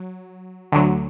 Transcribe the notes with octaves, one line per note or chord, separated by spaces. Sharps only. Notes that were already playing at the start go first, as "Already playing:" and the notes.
Already playing: F#3
D2 D3 F#3